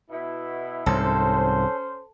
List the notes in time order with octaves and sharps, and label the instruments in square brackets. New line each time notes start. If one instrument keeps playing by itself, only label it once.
[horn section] B2 E4
[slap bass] C2 G#2 [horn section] C#4 C5 [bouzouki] A4